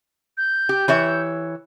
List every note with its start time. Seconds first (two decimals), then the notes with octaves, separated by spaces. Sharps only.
0.38 G6
0.69 G4
0.88 E3 C#5 E5